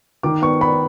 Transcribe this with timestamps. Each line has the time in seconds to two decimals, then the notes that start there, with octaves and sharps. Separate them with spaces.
0.23 D#3 D6
0.42 B3 C#6
0.61 B3 B5